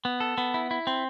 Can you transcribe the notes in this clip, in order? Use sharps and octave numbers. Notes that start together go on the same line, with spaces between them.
B3
A4
B3
E4
E4
C4